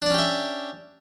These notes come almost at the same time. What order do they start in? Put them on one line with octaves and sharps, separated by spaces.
D4 D5 C#4 G4 E5